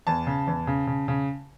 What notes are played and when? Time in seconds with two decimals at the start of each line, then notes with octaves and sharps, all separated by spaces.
0.07 E2 A5
0.27 C#3
0.47 E2
0.67 C#3
0.87 C#3
1.08 C#3